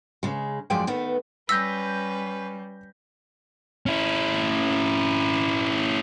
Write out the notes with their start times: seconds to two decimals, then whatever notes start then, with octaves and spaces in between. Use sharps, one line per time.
0.23 C#3 G#3
0.70 F#2 F3 G#3 D5 G5
0.87 D#3 A3 B3
1.49 G3 C#4 B4 E6 G6 A#6 B6
3.86 C#4 E4